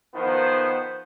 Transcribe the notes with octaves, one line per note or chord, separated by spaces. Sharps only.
D#3 F3 B3 C5